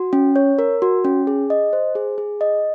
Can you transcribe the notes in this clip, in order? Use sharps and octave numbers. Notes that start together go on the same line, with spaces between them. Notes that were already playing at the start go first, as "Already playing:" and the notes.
Already playing: F#4
C#4
C#5
A#4
F#4
C#4
G#4
D#5
C5
G#4
G#4
D#5